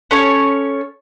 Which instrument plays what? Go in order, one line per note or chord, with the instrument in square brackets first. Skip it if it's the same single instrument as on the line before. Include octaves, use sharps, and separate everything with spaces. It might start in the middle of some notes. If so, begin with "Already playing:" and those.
[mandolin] C#4 A4 C#5